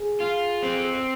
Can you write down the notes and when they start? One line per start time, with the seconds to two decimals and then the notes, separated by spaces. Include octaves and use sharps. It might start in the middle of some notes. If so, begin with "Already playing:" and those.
Already playing: G#4
0.20 F4
0.63 C4